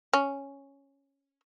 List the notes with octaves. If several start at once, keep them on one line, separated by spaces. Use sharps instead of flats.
C#4